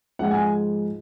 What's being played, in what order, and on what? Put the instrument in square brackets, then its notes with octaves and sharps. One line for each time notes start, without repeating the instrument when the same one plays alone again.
[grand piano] G#2 F3 G#3 F#5
G#5